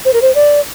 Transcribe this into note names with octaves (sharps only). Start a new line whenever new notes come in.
C5
A#4
C5
D5